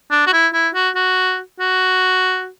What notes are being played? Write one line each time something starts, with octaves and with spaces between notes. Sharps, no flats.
D4
F#4
E4
E4
F#4
F#4
F#4